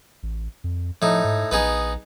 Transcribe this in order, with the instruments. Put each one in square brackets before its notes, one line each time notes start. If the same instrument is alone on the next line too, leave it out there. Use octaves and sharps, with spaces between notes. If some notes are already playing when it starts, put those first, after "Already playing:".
[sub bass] A1
F2
[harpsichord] A2 D#4 [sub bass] F3
[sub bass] G#2
[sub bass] A#1 [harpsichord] B3 D#4 G#4